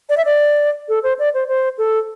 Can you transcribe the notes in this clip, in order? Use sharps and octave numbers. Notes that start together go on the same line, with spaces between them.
D5
E5
D5
A4
C5
D5
C5
C5
A4